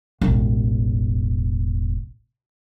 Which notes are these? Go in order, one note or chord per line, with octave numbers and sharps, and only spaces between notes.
E1 A1